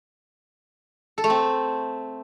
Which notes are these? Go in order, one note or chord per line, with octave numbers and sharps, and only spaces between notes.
A4
A3
C4